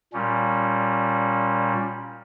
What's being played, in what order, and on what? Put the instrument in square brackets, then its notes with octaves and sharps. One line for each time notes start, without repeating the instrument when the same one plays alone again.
[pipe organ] A#2 G3 C#4